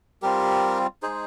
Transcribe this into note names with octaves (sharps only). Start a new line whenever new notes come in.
G3 C4 F4 G4 A#4
G#3 D#4 G#4 C5